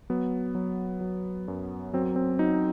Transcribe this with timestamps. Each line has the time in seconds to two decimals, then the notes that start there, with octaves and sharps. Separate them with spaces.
0.10 F#3 B3
0.55 F#3
1.01 F#3
1.48 F#2
1.93 F#3 C4
2.16 C4
2.39 F#3 D#4